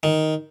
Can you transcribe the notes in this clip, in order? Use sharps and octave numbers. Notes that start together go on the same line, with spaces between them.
D#3